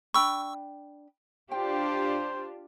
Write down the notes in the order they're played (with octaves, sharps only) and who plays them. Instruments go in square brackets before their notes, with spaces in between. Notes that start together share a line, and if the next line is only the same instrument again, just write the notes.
[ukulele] D4 G5 B5 [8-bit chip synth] C#6 E6
[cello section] D4 F4 G4 [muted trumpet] C5 [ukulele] G5